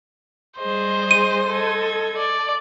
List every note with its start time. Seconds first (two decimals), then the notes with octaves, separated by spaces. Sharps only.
0.58 G3 G#4 C5 D#5
1.11 D#7
1.49 A4 D#5 G#6
2.17 D5